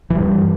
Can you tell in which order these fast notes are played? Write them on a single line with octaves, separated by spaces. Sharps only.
E3 G3 G2